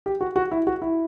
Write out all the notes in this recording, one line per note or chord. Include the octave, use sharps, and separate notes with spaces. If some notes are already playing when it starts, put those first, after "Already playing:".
G4
F#4
F#4
E4
F#4
E4